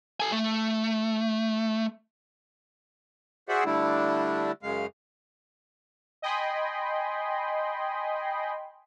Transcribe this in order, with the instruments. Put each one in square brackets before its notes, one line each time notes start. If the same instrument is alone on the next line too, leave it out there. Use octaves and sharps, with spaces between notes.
[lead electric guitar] A4 G#5
A3
[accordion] F#4 G#4 C5 D5 E5 F#5
D3 G3 A3 D4 E4
F#2 C#3 G#3 F5
[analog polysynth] D#5 G5 G#5 B5 C6